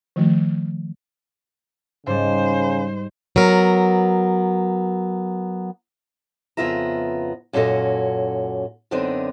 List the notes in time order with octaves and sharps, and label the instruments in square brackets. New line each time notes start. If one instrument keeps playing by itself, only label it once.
[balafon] D#3 F3 A3
[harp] G#2 G3 [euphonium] C#3 [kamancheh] C5
[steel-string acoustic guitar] F#3 B3 A#4
F2 C#3 B3 F4 E5 A#5
F#2 A#2 C#4 F#4 A4 D#5
F#2 D3 B3 C4 D4 D#4